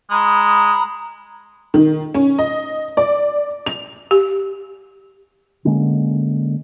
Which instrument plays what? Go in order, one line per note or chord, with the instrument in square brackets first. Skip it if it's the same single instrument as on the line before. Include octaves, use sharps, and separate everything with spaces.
[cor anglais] G#3 [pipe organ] A#5 B5 D#6
[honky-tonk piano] D#3
C#4
D#5
D5
F7
[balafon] G4
[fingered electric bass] D3 G#3 A#3 C#4